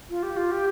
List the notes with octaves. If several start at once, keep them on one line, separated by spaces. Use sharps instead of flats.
F4
G4
F4
G4